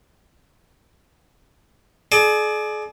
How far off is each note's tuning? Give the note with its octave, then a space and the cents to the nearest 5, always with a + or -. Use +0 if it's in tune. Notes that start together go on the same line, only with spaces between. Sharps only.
G#4 +40 D5 +20